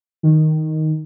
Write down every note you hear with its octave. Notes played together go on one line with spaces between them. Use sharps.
D#3